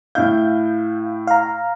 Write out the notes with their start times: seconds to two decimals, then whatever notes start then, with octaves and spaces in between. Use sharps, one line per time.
0.15 A2 E4 F5 G6
1.27 F5 A#5